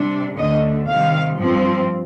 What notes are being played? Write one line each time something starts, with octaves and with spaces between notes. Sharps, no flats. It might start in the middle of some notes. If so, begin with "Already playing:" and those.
Already playing: C3 G3 D4
D2 D3 A3 D4 D#5
C3 D#3 G3 F5
G2 F3 C4